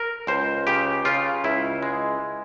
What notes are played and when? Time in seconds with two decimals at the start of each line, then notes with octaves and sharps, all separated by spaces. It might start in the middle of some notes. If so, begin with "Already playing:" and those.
Already playing: A#4
0.27 C#2 C5
0.67 C#3 G4
1.05 C#3 F4
1.44 C#2 E4
1.82 G#3